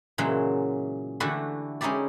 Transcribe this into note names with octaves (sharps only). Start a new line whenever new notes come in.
A#2 C#3 E3 F#3 G#3
D3 E3 A3 E4 F#4 G4
G#3 C#4 D#4 E4 G4 D5